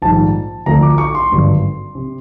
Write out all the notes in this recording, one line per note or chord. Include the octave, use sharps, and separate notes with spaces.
A#1 G#2 D#3 G3 A5
D2 D3 F3 A3 A#5
D6
C#6
C6
G#1 G2 D3 F#3
C3